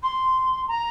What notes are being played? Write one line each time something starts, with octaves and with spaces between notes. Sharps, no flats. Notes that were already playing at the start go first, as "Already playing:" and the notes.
C6
A#5